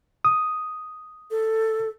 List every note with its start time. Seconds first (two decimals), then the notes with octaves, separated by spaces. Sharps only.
0.25 D#6
1.31 A4